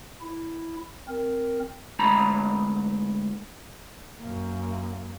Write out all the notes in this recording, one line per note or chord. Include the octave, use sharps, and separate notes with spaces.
E4
C4 A#4
D2 G#2 A#5 B5
F#2 A#3